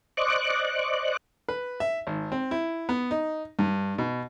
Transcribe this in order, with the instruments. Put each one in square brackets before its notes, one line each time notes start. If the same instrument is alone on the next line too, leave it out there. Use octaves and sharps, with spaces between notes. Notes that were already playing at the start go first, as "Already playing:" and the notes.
[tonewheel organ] C5 D5 D#5 C#6 D6 F#6
[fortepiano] B4
E5
G#1
C4
E4
B3
D#4
G2
B2